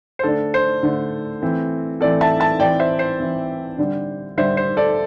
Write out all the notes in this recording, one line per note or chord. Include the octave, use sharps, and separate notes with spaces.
C5
D3 A3 D4 A4
C5
D3 A3 D4
E3 A3 C4
E3 A3 C4 A4 D5
E5 A5
E5 A5
E3 C4 D5 G5
C5 E5
C5
E3 C4
D3 G3 D4
D3 G3 D4 C5 E5
C5
A4 D5